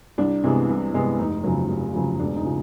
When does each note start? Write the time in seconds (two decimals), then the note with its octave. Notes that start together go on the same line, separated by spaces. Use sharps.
0.18 C2 D4
0.44 C3 E3 G#3 B3
0.69 C2
0.93 C3 E3 G#3 B3
1.19 F1 D#4
1.44 F2 C#3 F#3
1.69 F1
1.95 F2 C#3 F#3
2.20 E1 D4
2.36 D#4
2.45 C#3 F3